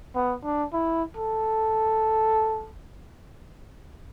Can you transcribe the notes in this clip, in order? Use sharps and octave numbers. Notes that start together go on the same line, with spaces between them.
B3
D4
E4
A4